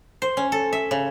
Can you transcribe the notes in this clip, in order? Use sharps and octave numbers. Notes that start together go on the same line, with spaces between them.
C5
C#4
A4
E5
C#3